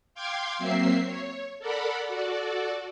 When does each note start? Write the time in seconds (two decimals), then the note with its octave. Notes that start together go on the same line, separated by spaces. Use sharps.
0.15 F5 G5 C6 D6 G#6
0.59 F#3 A#3 C4 E5 C7
1.05 C#5
1.59 A4 A#4 D5 F#5 B5
2.08 F#4 A4 D5